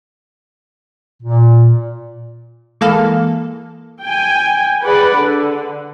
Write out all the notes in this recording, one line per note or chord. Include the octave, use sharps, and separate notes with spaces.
A#2
E3 G#3 A#3 A4 F5
G5 G#5
G#4 B4 D5 F#5
D3